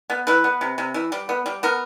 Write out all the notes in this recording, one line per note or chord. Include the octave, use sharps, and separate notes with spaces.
B3
E3 B4
B3
C3
C3
E3
G3
B3
G3
B3 A#4